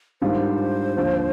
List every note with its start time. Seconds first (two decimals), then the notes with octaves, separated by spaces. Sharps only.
0.22 G#2 D#3 G3 D4 F4 C5
0.97 D#2 D3 F3 C4 F4